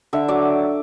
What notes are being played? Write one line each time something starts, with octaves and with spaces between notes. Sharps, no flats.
D3 E5
F#3 D5